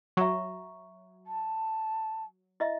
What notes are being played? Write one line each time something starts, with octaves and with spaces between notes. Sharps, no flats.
F#3 E5 A#5 C#6
A5
E4 D#5 E5